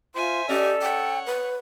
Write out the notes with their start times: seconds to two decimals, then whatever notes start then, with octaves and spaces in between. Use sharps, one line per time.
0.15 F4 C5 E5 G#5
0.49 C#4 G4 A4 D5 D#5
0.82 C#5 F#5 G5
1.26 B4